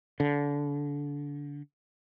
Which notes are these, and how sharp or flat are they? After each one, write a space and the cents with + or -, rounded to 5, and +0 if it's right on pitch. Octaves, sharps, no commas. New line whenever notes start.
D3 -25